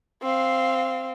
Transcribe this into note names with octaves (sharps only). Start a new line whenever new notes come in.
C4 F5